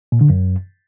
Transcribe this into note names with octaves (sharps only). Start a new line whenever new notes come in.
A#2
D3
F#2